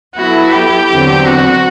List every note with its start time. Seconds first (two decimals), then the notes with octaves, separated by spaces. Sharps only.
0.15 F#3 B3 E4 F#4 A4
0.52 G4
0.89 E2 D3 F#3 C4
1.26 F#4